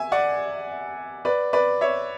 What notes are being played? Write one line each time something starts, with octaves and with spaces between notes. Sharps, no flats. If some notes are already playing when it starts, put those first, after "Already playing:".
Already playing: E5 G#5
D5 F#5
B4 D5
B4 D5
C#5 E5